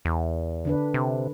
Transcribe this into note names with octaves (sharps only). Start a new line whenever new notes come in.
E2
D3 D4 B4
C3